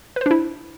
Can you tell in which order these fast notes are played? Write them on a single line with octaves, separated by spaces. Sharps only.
B4 C5 D4 E4